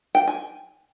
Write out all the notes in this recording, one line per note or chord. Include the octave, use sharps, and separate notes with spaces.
G5
G#5